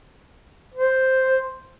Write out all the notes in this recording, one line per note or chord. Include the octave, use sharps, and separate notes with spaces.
C5